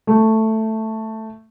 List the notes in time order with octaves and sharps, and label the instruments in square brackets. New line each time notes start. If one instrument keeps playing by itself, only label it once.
[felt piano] A3